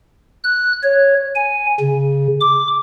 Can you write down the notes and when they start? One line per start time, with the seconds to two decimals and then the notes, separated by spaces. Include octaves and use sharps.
0.44 F#6
0.83 C#5
1.35 G#5
1.80 C#3
2.41 D6